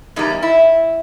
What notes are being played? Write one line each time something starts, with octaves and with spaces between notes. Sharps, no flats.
E2 C#3 G3 A#3 D#4
C#4
E4